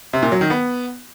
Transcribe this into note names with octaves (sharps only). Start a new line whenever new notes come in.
C3
A#2
F#3
D#3
B3